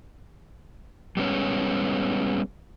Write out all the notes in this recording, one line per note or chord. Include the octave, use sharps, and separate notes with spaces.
G3 G#3 B3 C#4 C#5